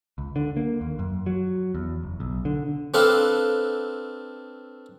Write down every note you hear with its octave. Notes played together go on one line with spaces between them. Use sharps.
C#2
D3
A#3
D#2
F#2
F#3
E2
F#1
B1
D3
C4 D4 A4 B4 F5